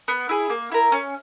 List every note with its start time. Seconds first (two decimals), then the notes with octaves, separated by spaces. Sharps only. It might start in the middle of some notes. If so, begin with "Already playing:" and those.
0.08 B3
0.29 E4 G#4
0.50 A#3
0.72 E4 A#4
0.92 C#4